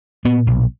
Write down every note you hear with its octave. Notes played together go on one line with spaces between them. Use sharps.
A#2 B3
B1